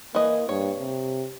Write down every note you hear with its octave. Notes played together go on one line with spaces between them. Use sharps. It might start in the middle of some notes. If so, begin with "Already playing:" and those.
E3 A#3 D#5
G2 C#5
C3